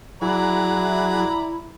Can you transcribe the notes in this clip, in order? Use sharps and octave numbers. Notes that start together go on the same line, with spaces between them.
F#3 E4 G#4 D5 A#5 B5